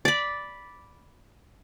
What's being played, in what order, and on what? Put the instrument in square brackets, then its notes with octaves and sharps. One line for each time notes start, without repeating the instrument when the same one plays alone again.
[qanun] D5 B5